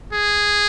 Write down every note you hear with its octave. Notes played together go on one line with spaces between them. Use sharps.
G#4